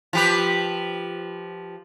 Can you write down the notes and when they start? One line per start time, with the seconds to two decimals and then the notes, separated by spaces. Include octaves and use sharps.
0.13 F3 G4 B4